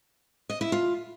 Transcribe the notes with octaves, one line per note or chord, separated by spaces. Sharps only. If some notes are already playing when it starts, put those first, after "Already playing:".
D#5
E4
F4